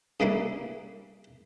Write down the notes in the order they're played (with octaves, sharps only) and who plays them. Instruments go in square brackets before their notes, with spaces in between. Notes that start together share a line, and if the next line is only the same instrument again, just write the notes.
[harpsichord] G2 C#3 G3 A#3 E4